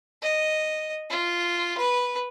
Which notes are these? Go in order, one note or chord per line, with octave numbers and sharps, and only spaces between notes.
D#5
F4
B4